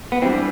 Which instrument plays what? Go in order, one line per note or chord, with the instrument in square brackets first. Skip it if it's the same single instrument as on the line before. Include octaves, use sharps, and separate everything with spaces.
[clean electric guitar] B3
[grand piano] E3 G3 D4 [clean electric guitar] C4